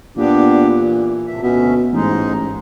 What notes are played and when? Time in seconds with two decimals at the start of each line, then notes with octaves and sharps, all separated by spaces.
0.17 A#2 B3 D4 G4
0.79 E3
1.27 A2 C3 E5
1.43 D2 B2 C#4 E5
1.93 A1 G#2 G#3 D#4